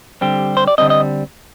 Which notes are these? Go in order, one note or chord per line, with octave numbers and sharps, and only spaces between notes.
D3 G3 C4 G4
C5
D5
D3 G3 C4 D#5
D#5